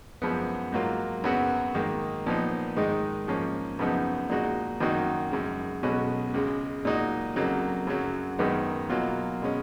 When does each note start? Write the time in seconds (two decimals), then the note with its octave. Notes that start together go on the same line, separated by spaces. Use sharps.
0.22 F#2 F3 G#3 B3
0.72 G#2 F#3 A#3 F4
1.24 F#2 C#3 F#3 B3 F#4
1.75 G#2 D#3 A#3
2.26 A#2 F3 B3 D#4
2.77 G#2 D#3 G#3 D#4
3.28 G#2 F3 A#3 C#4
3.79 F#2 C#3 F3 B3 D#4
4.30 A#2 G#3 D#4 F#4
4.80 F#2 D#3 A#3 D#4 F#4
5.31 F#2 C#3 G#3
5.83 B1 B2 G#3 C#4 F#4
6.34 C#2 C#3 G#3
6.85 A#2 G#3 D#4 F#4
7.36 F2 C#3 F#3 A#3 D#4
7.87 F#2 C#3 F#3
8.39 F#2 D#3 G#3 B3 D#4
8.90 B2 F#3 A#3 F4
9.42 B2 G#3 C#4